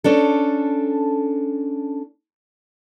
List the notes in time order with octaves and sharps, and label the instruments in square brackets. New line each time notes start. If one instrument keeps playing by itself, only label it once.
[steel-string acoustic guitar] C#4 D4 A4